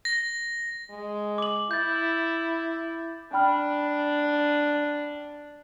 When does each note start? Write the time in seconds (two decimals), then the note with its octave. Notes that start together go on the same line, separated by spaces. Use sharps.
0.05 A#6
0.90 G#3
1.38 D6 F#7
1.71 E4 G6 A6
3.33 D4 G5 B5 F6